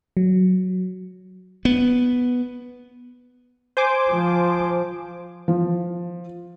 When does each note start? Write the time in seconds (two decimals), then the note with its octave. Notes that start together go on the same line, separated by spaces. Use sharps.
0.17 F#3
1.65 B3
3.77 C5 G#5 D6
4.10 F3
5.48 F3